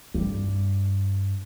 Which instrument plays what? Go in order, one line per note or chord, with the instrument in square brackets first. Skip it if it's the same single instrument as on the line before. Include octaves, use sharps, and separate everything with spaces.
[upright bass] G2